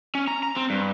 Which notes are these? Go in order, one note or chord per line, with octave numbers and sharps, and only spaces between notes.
C#4
A#5
A#5
C4
G2